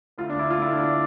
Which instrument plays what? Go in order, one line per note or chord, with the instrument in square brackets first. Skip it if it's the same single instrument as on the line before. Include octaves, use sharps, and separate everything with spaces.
[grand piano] D2 F4
D4
D2 E4
D2 F4
E4
D2
D4
D4